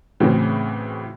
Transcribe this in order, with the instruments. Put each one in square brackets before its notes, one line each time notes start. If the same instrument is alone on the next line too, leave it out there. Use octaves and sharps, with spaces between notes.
[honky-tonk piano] A2 C#3 E3 C4 F#4